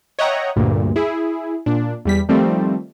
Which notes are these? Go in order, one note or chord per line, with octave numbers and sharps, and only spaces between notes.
C#5 D#5 E5 F#5 G5 A#5
D2 G2 A#2
E4 G#4
A#2 D4
E2 G3 B6
D#3 F3 G3 A3 C4